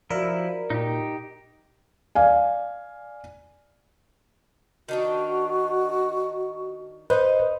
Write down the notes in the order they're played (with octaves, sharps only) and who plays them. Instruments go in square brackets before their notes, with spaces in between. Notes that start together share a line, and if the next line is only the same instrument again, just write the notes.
[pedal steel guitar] F3 E4 [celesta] F#4 D5 [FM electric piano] A#4
[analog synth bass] A#2 [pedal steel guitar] D#4 G4
[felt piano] D5 F5 G#5
[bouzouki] D#3 D4 D#4 [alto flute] F#4
[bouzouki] D#4 D#5 [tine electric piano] B4 C5